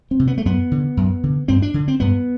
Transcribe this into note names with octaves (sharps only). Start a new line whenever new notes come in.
C4
C3
B3
A3
F#2 B3
D3
F#2
D3
G2 C4
D4
D3
C4
G2 B3